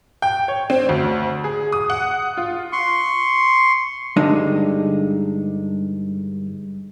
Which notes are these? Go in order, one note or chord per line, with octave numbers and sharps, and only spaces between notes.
G5
C#5
C4
D2
G#4
D#6
F#5
F4
C6 C#6
G2 D3 G#3 D#4